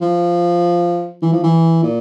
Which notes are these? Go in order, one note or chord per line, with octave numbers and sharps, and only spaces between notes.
F3
E3
F3
E3
A#2